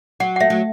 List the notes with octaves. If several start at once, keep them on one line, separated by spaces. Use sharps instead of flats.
F#3 F#5
F#5
A3 E5
F#3